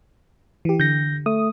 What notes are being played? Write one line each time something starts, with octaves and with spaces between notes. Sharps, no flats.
E3 G4
D3 G6 A#6
A3 D#6